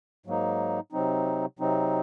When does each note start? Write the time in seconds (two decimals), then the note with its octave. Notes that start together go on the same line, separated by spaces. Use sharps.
0.26 G#2 F#3 A#3 D#4
0.92 C3 F#3 C4 D#4
1.59 C3 F#3 C4 D#4